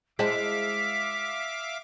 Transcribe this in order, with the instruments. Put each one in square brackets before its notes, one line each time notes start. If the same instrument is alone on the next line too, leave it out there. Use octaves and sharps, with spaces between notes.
[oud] G#3 [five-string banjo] E4 C5 A5 [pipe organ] E5 F5 D6 [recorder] B6